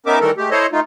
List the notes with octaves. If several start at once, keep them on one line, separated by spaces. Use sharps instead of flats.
B3 C#4 D#4 A#4 E5 D6
D#3 E3 G3 A3 A4 A#4
G#3 A3 G4
E4 A4 C5 C#5 D#5
A3 D#4 F4